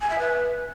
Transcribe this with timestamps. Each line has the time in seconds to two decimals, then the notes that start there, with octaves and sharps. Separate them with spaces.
0.01 G#5
0.10 E5
0.19 B4